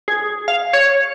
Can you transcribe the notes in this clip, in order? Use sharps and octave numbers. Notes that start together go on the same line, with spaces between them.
G#4
F5
C#5